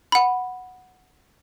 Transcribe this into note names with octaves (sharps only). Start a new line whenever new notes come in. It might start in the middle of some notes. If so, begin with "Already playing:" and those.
F#5 B5